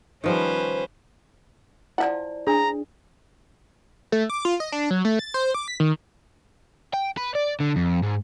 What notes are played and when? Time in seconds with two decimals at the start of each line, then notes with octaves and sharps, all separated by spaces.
0.24 D#3 F3 G3 C#4 B4 C5
1.98 F3 E4 D5 E5 F#5
2.47 D4 G#4 A#5
4.12 A3
4.30 D6
4.45 F4
4.60 D#5
4.72 D4
4.90 F#3
5.05 A3
5.19 A6
5.34 C5
5.54 D6
5.68 B6
5.80 D#3
6.94 G5
7.17 B4
7.35 D5
7.60 D3
7.76 F2
8.03 G#2